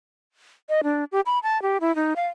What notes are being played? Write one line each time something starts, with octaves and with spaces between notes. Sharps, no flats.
D#5
D4
G4
B5
A5
G4
E4
D#4
F5